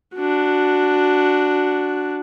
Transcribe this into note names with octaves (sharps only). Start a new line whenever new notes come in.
D4 F#4